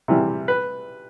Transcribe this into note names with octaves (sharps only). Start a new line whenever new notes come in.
C3 E3 G3
B4